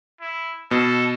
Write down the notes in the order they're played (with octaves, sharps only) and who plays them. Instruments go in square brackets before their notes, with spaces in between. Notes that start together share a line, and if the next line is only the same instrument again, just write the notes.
[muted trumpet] E4
[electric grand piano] B2 [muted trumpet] A4